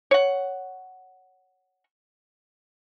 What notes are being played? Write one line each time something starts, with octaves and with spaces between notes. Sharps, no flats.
C#5 F#5